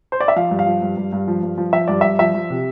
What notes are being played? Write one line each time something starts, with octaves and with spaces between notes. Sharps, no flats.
C5
D5
E5
F3 F5
G2
F5
F3
G2
G2
G2
F3
G2
F3
F3 E5
G2 D5
G2 E5
F3 E5
F3
C3